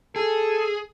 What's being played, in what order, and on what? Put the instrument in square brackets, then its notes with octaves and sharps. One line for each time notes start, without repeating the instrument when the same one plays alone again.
[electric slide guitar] G#4 [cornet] A4